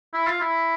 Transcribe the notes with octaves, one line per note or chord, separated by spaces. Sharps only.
E4
F4
E4